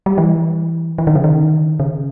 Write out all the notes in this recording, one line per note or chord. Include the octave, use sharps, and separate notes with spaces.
G3
E3
E3
D#3
C#3
D#3
C#3